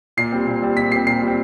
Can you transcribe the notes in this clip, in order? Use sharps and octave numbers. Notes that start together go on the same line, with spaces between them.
A#2 C7
G3 C4
A#2
G3 C4
A#2 B6
G3 C4 C7
A#2 C7
G3 C4